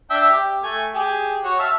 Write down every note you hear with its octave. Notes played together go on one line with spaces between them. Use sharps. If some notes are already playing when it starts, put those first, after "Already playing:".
D4 E5 G5
G4
A3 G#5
G4 G#4
F#4 C#5
E5 F5 A5